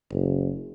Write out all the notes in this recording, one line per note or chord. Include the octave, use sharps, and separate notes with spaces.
F#1